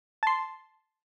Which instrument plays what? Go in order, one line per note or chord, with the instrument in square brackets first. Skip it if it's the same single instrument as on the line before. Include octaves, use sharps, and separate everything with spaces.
[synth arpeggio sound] A5 C6